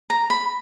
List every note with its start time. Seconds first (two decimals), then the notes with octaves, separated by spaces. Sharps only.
0.10 A#5
0.30 B5